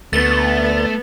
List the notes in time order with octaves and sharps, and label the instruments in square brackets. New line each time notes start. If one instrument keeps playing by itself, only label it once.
[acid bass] D2 [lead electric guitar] A3 [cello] B3 [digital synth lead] A6